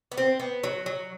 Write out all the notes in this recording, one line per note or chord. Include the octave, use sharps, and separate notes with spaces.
B3
C4
B3
F#3
F#3